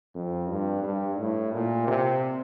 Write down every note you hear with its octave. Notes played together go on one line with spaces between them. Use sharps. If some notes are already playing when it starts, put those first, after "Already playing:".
F2
G2
G2
A2
A#2
C3